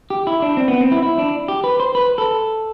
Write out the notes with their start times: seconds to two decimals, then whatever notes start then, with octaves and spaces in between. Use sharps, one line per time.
0.10 G4
0.27 E4
0.42 D4
0.57 C4
0.68 B3
0.81 C4
0.91 E4
1.03 E4
1.18 D4
1.48 G4
1.64 B4
1.80 C5
1.95 B4
2.18 A4